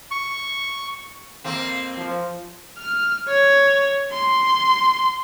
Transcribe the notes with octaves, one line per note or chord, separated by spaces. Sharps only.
C#6
F2 A#3 C4
F3
F6
C#5
C6